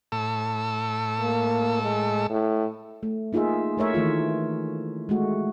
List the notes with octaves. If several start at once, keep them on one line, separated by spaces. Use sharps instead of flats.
A2 A4 E6
A#3
G#3
A2
A3
A#3 D#4 F4 G#4 E5
A3 A#4 C#5 E5
D#3 E3 A3 F4
G#3 A3 F#4